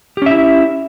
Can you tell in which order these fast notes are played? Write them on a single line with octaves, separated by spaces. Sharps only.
G4 C#4 E5 E4